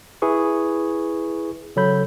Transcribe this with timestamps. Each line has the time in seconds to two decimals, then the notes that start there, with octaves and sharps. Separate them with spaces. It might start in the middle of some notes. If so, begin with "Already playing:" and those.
0.22 E4 G#4 B4 C#6
1.76 C#3 F#3 A4 C#5 B5 G6